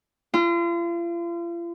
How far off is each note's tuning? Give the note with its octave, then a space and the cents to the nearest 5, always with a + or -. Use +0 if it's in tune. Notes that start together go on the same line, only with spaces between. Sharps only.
F4 -40